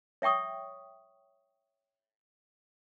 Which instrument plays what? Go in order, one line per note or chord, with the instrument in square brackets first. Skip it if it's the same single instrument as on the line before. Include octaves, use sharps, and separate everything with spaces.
[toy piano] C#5 E5 G5 C#6 D#6